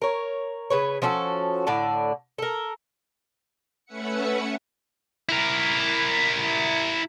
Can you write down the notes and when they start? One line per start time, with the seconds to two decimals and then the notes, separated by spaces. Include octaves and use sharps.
0.02 A#4 C#5
0.70 C#3 B4 C#5
1.02 F3 C#4 F#4 A4
1.67 A2 D3 D5 A5
2.38 A4 A#4
3.86 A3 C#4 B4 E5 F#5 C#7
5.29 E4 A#4